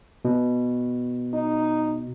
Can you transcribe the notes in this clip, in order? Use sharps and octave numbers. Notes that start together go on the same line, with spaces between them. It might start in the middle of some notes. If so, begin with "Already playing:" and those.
B2
D#4